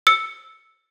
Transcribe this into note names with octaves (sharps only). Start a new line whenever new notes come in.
E6 C#7